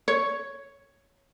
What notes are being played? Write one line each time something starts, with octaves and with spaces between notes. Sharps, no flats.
C#5